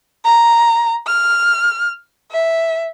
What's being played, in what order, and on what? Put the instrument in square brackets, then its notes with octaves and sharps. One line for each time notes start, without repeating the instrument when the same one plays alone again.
[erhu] A#5
F6
E5